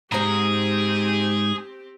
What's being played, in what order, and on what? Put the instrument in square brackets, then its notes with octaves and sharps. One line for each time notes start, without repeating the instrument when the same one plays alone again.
[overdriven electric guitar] G#2 [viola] C4 G4 [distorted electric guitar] G#4 [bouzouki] C5 A#5